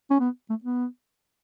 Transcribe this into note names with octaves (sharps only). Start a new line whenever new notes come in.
C#4
B3
A3
B3